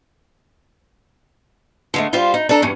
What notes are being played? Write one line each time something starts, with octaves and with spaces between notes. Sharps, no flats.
D3 G#3 A3
G3 F4 C5 F5
D#4
D4 A4 A#5
E2 G2 C#4